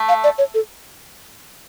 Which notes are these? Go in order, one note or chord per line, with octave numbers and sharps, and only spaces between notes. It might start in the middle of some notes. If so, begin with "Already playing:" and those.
Already playing: A3
F5
D5
C#5
A4